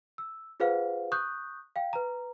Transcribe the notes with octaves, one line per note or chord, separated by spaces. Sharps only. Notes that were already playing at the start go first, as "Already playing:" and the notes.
E6
F4 G#4 B4 C5 F5 F#5
C#6 D#6 F#6 G6
F5 G5
B4 A#5